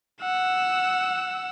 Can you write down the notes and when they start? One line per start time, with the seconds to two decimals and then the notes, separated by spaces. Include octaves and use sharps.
0.21 F#5 E6